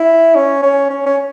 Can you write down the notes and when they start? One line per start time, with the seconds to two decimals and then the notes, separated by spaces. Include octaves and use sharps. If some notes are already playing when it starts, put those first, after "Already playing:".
Already playing: E4
0.35 C#4
0.62 C#4
0.90 C#4
1.06 C#4